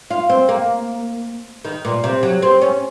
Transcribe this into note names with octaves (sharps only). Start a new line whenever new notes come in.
F4
C4
A#3
D#3
A#2
C3
F#3
C4
C#4